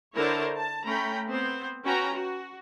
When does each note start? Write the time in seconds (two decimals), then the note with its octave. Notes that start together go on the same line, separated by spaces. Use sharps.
0.15 D3 E4 A#4 C5 C#5 A5
0.54 A5
0.84 A3 C#4 G5 A#5 B5
1.29 B3 C4 C5
1.84 C#4 F#4 B4 G5 A#5
2.15 F#4